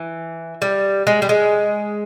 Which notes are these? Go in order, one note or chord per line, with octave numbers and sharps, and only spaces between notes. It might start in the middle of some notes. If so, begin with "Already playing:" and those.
Already playing: E3
G3
G#3
G3
G#3